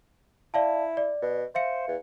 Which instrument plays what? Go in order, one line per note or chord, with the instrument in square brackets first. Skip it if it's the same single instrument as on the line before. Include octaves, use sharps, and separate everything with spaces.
[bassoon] E4 [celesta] D5 F5 A5
[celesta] D5
[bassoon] B2
[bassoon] C5 [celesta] E5 F5 C#7
[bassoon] E2